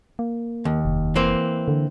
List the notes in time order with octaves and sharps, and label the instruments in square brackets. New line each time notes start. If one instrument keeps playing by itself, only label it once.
[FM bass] A#3
[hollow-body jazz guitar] D#2
[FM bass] F1
[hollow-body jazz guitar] E3 A#3 C4
[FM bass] D3